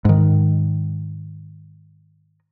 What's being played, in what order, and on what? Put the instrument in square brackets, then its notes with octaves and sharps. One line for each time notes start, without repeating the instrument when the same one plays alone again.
[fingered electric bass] G#2 D#3